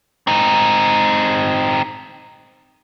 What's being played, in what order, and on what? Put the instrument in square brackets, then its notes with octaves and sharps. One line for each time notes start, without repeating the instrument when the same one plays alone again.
[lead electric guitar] C4 D#4